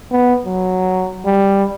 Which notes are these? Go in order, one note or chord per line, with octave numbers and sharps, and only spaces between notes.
B3
F#3
G3